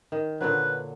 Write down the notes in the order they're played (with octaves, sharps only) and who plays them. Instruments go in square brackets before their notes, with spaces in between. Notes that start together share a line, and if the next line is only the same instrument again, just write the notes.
[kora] D#3
[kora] A#2 D3 F#3 [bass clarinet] B4